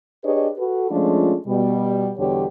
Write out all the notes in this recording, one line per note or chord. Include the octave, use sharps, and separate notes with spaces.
D4 G4 G#4 B4 C#5 D#5
F#4 A4 B4
F3 G#3 A3 C#4 D4 F4
B2 G3
E2 B2 D3 G3 G4 C#5